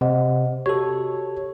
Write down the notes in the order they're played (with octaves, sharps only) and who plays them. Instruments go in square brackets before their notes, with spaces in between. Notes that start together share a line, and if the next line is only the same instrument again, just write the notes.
[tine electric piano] C3 [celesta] C5 D#5 F#5
[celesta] F#4 G4 [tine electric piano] A4 C#5